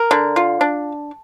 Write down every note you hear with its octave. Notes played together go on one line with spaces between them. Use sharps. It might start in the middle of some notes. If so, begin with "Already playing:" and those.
Already playing: A#4
D3
F4
D4